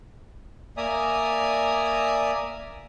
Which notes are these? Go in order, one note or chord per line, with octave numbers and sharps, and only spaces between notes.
A#3 D5 E5 G#5 A#5 D#6